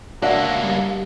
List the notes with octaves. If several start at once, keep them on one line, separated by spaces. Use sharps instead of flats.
C#2 A#3 D4 F#4 E5
G3